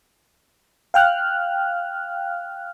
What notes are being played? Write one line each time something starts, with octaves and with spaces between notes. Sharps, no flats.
F5 G5 F6 F#6